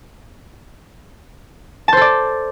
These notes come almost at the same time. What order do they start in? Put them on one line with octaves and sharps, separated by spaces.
A5 C5 A4 D5